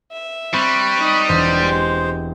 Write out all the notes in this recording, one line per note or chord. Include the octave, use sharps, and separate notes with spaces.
E5
G3 C4 B5 C#6 F#6
D#4 D#6
E1 C5
G#3 G4